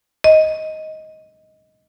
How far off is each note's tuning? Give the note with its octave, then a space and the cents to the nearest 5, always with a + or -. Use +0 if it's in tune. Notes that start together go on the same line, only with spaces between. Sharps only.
D#5 +10